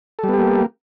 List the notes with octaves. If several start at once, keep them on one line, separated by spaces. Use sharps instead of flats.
G3 A#3 B3 G4 A4